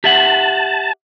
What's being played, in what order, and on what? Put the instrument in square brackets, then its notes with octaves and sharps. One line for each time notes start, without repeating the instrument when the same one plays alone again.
[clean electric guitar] G4 E5 F#5 [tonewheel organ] A5